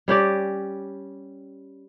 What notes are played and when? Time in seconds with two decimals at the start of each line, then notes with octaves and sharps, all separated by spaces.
0.08 G3 C#4 G4 D5